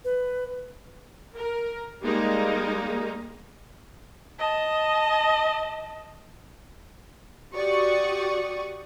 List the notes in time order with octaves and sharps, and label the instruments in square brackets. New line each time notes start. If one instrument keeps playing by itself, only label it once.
[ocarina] B4
[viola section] A#4
G3 G#3 A#3 D#4
[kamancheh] D#5 A5
[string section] F#4 G4 D5 C#6 D#6